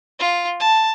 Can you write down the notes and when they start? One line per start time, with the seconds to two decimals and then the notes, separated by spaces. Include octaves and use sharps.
0.20 F4
0.60 A5